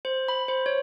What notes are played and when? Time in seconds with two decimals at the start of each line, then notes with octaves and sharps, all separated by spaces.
0.05 C5
0.28 B5
0.48 C5
0.66 C#5